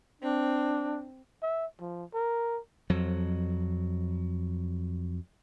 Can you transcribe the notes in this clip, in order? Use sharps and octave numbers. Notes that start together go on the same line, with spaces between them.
C4 D4
E5
F3
A#4
F2 F#3